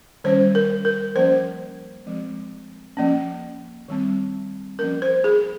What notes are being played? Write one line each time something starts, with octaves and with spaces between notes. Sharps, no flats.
D#3 G3 C#4 C5
A#4
A#4
F3 A#3 C#4 C5
F3 G#3 C4
F3 A#3 C#4
D#3 G3 C4
F3 A#3 C#4 A#4
C5
G#4